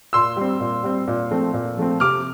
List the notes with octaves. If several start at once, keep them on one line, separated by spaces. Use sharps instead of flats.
A#2 C6 E6
G3 C4
A#2
G3 C4
A#2
F3 A3 C4
A#2
F3 A3 C4
C3 D6 F6